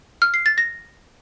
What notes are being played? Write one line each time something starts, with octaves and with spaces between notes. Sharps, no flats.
F6
C7
A6
A#6